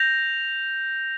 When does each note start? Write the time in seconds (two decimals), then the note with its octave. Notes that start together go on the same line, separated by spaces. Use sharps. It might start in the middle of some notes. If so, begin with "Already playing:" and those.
Already playing: G6 A#6 F7